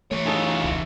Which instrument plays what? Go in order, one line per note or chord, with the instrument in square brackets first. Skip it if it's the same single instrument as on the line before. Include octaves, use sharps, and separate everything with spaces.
[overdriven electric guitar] E3 C#5 [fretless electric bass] A3
[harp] D#4 A4 [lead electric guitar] F4 G#4
[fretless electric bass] E1 C#2